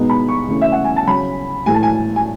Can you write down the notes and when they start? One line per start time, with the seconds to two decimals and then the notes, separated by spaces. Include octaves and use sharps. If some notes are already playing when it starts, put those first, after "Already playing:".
Already playing: B2 G#3 B3 D#4
0.10 B5
0.28 C#6
0.48 C#3 E3 A3 C#4
0.61 E5
0.72 F#5
0.84 G#5
0.96 A5
1.07 C#3 F#3 C#4 B5
1.66 A2 E3 A3 G#5
1.74 A5
1.83 G#5
2.16 G#5